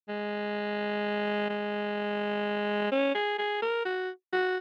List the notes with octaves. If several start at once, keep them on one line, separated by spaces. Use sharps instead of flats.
G#3
G#3
C#4
G#4
G#4
A#4
F#4
F#4